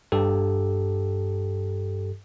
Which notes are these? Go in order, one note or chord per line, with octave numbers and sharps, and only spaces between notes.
G2 G4 A4